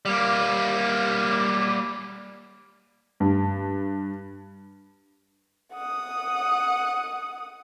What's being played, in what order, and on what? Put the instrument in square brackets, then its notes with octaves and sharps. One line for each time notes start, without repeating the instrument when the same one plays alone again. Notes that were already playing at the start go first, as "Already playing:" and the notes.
[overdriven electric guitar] G3 A#3
[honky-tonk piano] G2
[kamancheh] F#5 D#6